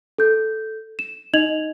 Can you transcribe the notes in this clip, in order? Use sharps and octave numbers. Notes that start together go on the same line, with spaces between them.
A4 G6
E7
D#4 D#5 G#6 F7 F#7